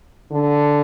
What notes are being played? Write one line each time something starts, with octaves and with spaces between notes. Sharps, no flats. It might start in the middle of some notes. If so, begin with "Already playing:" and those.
D3